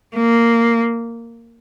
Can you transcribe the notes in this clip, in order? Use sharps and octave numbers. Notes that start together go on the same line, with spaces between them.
A#3